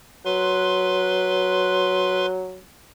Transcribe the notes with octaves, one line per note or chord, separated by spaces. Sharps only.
F#3 B4 C6